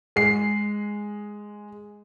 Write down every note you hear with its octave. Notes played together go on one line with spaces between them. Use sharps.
G#3 C7